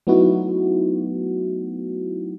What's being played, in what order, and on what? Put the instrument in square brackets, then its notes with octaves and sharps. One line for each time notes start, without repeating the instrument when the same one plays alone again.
[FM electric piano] F#3 A3 B3 D#4 E4 F#4